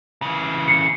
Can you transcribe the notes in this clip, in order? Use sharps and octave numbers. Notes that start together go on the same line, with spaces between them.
C#3 E3
C7 C#7